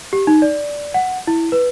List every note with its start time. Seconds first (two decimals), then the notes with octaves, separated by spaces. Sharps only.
0.13 G4
0.27 D#4
0.42 D5
0.94 F#5
1.27 E4
1.52 B4